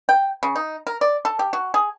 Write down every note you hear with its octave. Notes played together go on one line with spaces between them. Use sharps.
G5
C#3
D#4
A#4
D5
A4
G4
F#4
G#4